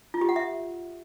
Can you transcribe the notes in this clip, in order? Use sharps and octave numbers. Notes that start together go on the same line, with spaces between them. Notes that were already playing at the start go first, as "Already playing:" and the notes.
F4
G4
F#5
E5